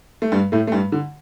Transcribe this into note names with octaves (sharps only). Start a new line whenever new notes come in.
A3
G2 G3
A2 A3
A3
G2 G3
D3